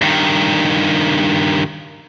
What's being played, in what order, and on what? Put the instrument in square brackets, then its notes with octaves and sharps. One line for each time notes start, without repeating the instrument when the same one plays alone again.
[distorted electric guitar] G2 D#3